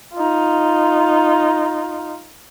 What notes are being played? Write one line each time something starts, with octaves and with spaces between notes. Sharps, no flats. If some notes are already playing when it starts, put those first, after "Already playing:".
D#4 F4